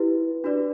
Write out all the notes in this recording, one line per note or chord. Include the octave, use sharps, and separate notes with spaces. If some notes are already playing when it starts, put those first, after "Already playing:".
Already playing: E4 G4 B4
D4 F#4 B4 D5